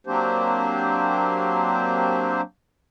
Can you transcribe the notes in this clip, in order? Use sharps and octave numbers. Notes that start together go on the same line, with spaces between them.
F#3 A#3 C4 D4 G4 C5